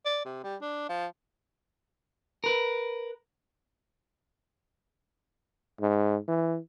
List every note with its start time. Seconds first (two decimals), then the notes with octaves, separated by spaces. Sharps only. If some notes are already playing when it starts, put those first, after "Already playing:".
0.05 D5
0.25 C3
0.44 G3
0.62 D4
0.89 F3
2.44 A#4 B4
5.81 G#2
6.28 E3